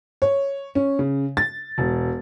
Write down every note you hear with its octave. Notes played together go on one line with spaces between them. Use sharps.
C#5
C#4
C#3
A6
E1